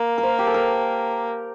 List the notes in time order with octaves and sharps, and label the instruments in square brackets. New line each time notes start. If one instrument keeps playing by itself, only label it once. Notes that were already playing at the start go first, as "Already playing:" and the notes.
Already playing: [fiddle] A#3
[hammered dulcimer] A#4
C5
G4
A4
A#4